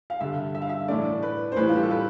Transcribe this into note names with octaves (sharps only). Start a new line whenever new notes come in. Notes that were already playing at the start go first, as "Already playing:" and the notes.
F5
G2 D3 G3 E5
E5
F5
E5
A2 E3 A3 D5
B4
C5
A2 E3 G3 B4
F4
G4
A4
B4